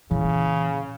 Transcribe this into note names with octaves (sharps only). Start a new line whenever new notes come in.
A#2 C#3 E3